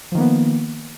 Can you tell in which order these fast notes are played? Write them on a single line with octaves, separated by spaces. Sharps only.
F3 D#3 A#3 B3